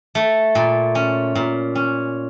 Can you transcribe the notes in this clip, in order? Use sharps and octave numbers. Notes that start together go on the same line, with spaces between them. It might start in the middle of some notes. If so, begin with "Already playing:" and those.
A3
A#2
C#4
A#2
C#4